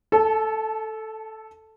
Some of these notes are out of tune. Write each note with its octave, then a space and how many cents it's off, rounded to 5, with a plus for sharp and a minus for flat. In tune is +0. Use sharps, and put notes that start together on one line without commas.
A4 +0 A5 -35